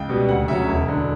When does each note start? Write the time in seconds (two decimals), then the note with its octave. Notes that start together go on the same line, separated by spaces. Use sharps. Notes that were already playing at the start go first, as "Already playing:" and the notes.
Already playing: C#2 G5
0.09 B2 G3 B3
0.28 D2 F#5
0.48 C#3 F#3 C#4 E5
0.68 E1
0.88 D3